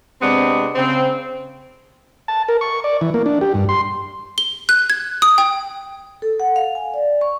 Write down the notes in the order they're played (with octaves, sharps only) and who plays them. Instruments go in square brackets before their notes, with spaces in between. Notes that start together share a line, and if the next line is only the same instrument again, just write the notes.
[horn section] C3 G#3 B3 C4 D4
C#3 C4
[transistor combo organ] A5
A#4
C#6
D5
E3
A#3
D4
G4
G2
C6
[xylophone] G7
F#6
G#6
D#6
G5
[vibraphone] A4
F#5
F5
G#5
D5
C#6